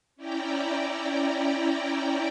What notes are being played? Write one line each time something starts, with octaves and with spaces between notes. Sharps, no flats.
C#4 E4 D5 G5 A#5